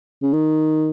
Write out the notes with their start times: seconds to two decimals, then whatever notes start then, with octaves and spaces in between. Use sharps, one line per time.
0.22 C#3
0.33 D#3